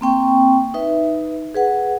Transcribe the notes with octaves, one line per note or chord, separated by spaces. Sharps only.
A#3 C4 G5 C#6
D#4 B4 E5
G#4 B4 F#5